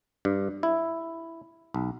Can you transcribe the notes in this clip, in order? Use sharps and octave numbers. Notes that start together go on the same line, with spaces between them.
G2
E4
B1